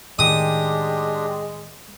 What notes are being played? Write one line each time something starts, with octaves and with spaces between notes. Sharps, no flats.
A2 D#3 G#3 D4 G4 D#6